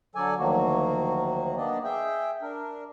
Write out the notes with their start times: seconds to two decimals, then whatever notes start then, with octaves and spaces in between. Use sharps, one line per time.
0.15 D3 F#3 A4 D5 G#5
0.39 D2 D#3 F3 F#3 A#3 F#4
1.57 A#3 B3 D4 D5 D#5
1.84 G#4 E5 G5
2.42 D4 A#4